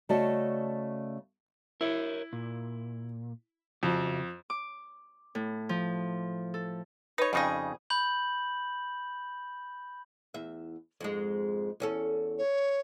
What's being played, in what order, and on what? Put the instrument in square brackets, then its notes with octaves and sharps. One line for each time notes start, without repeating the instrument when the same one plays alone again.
[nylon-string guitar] C#3 A3 F#4 D5 D#5 A5
[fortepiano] E4 [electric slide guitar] A#4 C#5
[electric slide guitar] A#2
[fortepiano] F2 [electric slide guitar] C#3 F#4
[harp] D6
A2
F3
A4
[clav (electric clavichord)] D#4 [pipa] B4 C#5
[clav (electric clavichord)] F2 C#3 D#4 [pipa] F3 G3 G#4
[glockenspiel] B5 G6 F#7
[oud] E2 E5
F2 G#2 G#3
E2 C#4 A4
[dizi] C#5